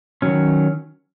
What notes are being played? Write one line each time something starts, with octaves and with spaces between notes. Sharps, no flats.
D#3 F#3 C#4